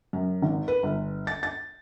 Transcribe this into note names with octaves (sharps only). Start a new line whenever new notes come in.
F#2
G#1
B4
G1
A6
A6